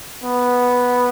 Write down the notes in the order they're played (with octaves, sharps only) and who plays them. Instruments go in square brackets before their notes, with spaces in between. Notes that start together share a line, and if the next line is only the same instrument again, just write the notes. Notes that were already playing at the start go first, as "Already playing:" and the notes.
[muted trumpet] B3